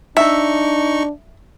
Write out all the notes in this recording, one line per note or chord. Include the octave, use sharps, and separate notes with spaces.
D4 D#4 E5 C#6